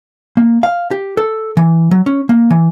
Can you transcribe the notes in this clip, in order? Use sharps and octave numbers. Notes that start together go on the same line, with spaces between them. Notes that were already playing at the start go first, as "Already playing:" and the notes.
A#3
F5
G4
A4
E3
F#3
C#4
A#3
E3